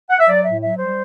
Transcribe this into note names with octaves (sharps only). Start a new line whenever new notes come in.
F#5
E5
F#3 D5
A2 E5
F#3 E5
G3 C5